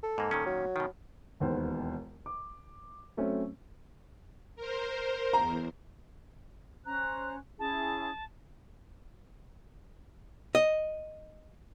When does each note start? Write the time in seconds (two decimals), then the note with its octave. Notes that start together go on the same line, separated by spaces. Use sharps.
0.03 A4
0.18 G#2 A#3
0.31 A#2 D#3 C#4
0.46 F#3
0.76 B2 D#3
1.40 E1 D#2 B3 C5
2.26 D6
3.17 F#3 A3 C4 C#4
4.56 A#4 C5
5.33 E2 A#5
6.86 C#4 C5 A#5 F#6
7.59 C#4 E4 G#4 A5
10.55 D#5